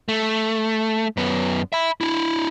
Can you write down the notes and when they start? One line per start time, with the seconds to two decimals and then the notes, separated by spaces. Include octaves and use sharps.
0.09 A3
1.17 F#2 B3
1.73 E5 B5
2.01 D4 E4